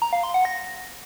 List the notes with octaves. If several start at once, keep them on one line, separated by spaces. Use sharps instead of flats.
A#5
F5
C6
F#5
A#6